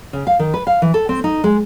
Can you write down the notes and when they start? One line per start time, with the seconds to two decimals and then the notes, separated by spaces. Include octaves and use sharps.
0.13 C#3
0.27 F5
0.39 D#3
0.54 B4
0.67 F5
0.82 E3
0.94 A4
1.09 C4
1.24 D#4
1.44 G#3